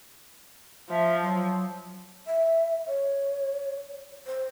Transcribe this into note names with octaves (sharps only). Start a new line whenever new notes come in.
F3 E5
F#3
E5
C#5
C5